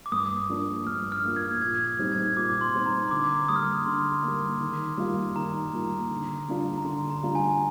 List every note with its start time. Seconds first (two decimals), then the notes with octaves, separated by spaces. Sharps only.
0.06 D6
0.12 G2 D#6
0.49 F3 A#3 D4
0.86 G2 F6
1.12 F6
1.24 F3 A#3 D4
1.36 G#6
1.61 A#2 G#6
1.87 G#6
1.99 G3 C4 D#4
2.12 G#6
2.36 A#2 D6
2.61 C6
2.74 G3 C4 D#4
2.86 A#5
3.11 D3 D6
3.49 G3 A#3 D#6
3.56 F6
3.64 D#6
3.86 D3 C6
4.23 G3 A#3
4.60 D#3
4.98 G3 A#3 F4
5.36 D#3 A#5
5.73 G3 A#3 F4
6.10 D3
6.48 G3 D4 F4
6.78 A#5
6.85 D3 C6
7.10 A#5
7.23 G3 D4 F4
7.35 G#5